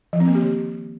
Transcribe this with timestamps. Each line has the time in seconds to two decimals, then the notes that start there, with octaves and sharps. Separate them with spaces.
0.13 F3
0.20 C4
0.28 A#3
0.35 G4
0.42 D#3